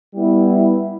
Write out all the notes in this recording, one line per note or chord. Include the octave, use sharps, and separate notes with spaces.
G3 B3 E4